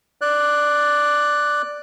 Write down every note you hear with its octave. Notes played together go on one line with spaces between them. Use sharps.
D5 F#6